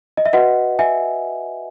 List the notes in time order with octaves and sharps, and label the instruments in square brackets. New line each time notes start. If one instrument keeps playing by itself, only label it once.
[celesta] D#5
E5
F#4 B4 D#5 F#5
E5 G#5